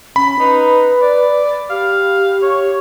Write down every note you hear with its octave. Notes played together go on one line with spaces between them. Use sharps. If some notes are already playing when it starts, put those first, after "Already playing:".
C#4 B5
D#4 B4
D5
G4 F5
C#5